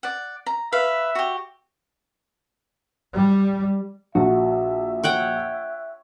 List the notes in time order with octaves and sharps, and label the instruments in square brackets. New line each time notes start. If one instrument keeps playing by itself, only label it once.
[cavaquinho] D5 F#5
A#5
[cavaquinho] B4 F5 [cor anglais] E5
[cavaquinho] F#4 G4
[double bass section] G3
[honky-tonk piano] A#1 [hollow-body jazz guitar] F#4 [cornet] E5
[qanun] C#5 F#5 G5